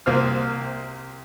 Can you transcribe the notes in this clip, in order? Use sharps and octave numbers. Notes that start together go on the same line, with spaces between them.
C2 A#3 C4 C5 F6